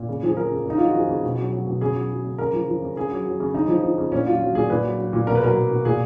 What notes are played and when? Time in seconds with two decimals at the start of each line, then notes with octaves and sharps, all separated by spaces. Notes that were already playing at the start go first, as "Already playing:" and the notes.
Already playing: A#2
0.09 C#3
0.23 F3 G#4
0.37 F3 A#4
0.51 C#3
0.66 C#3 D#4
0.78 F3 F4
0.86 F#4
0.94 F3 G#4
1.08 C#3
1.23 B2
1.39 F#3
1.53 F#3
1.67 B2
1.81 C#3 G#4
1.95 F#3
2.10 F#3
2.24 C#3
2.38 C#3 A#4
2.53 F3
2.68 F3
2.82 C#3
2.97 C#3 G#4
3.11 F#3
3.26 F#3
3.40 C#3
3.54 C#3 D#4
3.68 F3
3.83 F3
3.98 C#3
4.12 A#2 C#4
4.26 F#3 F4
4.41 F#3
4.55 A#2 G#4
4.70 A#2 B4
4.84 F#3
4.98 F#3
5.13 A#2
5.27 B2 A#4
5.35 B4
5.42 F#3 A#4
5.56 F#3
5.71 B2
5.85 A#2 G#4